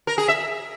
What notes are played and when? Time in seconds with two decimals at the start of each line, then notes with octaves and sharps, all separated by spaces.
0.07 A#4
0.18 G#4
0.28 E5